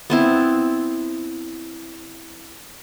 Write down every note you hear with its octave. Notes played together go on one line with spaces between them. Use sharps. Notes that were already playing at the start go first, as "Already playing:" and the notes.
B3 C4 E4